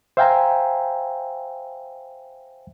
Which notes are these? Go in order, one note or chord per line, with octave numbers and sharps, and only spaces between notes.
C5 E5 F5 G5 G#5 A#5